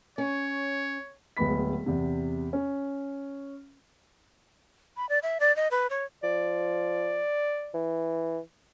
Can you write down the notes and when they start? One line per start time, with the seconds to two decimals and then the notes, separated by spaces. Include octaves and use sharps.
0.18 C#4 C#5
1.37 D1 G#3 B3 B5 B6
1.86 E2 C3
2.53 C#4
4.97 B5
5.09 D5
5.23 E5
5.40 D5
5.56 D#5
5.71 B4
5.90 C#5
6.23 F3 D5
7.74 E3